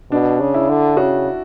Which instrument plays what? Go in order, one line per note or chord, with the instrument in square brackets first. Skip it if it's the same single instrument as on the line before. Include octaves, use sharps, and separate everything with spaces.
[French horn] B2 [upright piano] D4
[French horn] C#3
[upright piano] E4
[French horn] D3
[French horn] C#3 [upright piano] F#4